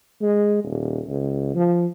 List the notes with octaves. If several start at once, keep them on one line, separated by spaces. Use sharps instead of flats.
G#3
D#1
C#2
F3